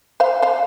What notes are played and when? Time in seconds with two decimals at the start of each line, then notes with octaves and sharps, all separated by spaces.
0.20 C5 F5
0.42 C5 F5